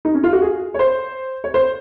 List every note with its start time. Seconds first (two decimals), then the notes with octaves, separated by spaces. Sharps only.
0.05 D#4
0.14 C#4
0.24 F4
0.33 F#4
0.42 G#4
0.74 C#5
0.79 C5
1.44 C#5
1.54 C5